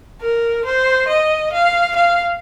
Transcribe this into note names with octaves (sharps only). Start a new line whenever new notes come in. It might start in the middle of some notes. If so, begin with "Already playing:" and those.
A#4
C5
D#5
F5
F5